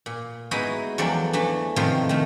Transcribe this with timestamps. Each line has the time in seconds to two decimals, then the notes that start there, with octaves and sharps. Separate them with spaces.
0.06 A#2
0.51 G#3 B3 D#4 E4 F#4 G#4
0.98 E2 F3 F#3 A4 D5 G5
1.33 E3 A3 D4
1.76 A2 C3 D#3 F3 A3 F4
2.09 D#3 A3